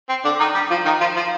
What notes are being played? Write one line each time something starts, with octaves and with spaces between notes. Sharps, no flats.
C4
D3 D4
D#3 D#4
G3 G4
F3 F4
D#3 D#4
F3 F4
F3 F4